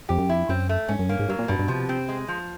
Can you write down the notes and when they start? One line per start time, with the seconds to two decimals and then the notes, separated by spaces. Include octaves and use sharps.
0.09 F2 G4
0.19 F#2
0.29 F2 E4
0.49 F#2 C4
0.69 A3
0.88 G#2 C#4
0.99 F#2
1.09 G2 A#3
1.19 G#2
1.28 G2 F#3
1.39 A#2
1.48 G2 B2
1.59 G2
1.68 C3 F3
1.89 C4
2.09 G#3
2.28 F3